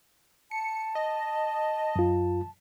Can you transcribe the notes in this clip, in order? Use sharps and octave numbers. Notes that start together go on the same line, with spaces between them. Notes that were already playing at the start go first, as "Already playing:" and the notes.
A5 C#7
D#5
F#2 F4